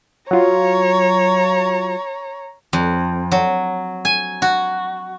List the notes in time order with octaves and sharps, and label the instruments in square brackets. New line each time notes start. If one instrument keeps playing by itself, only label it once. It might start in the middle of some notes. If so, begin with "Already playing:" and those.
[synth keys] F#3 F4 [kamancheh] C#5 A#5
[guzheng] F2
F#3
G#5
F#4